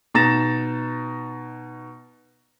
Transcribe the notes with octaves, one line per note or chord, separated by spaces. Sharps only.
B2 D#4 A#5 A6 A#6 E7